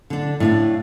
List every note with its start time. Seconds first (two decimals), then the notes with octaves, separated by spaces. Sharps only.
0.10 D3 D4
0.40 A2 D4 F5